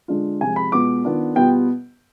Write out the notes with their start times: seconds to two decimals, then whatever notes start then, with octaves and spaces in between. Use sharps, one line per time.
0.08 D3 G#3 D4 F4
0.41 C3 F3 G#3 G#5
0.56 B5
0.72 B2 G#3 B3 F4 D6
1.05 D#3 B3 D4 F4
1.36 B2 G3 B3 F4 G5